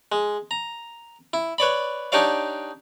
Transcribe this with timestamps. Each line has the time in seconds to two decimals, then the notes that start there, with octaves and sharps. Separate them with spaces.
0.12 G#3
0.51 A#5
1.33 E4
1.58 B4 C#5 D5 B5
2.12 D4 D#4 G4 C#5 D5 F5